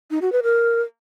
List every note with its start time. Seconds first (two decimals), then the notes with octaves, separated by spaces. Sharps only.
0.11 D#4
0.22 F#4
0.32 B4
0.43 A#4